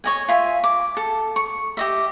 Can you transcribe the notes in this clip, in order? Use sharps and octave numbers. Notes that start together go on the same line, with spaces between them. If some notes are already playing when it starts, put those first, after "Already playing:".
C#5 D#5 G#5
F4 E5 G#5
D6
A4
C#6
G4 D#5 E5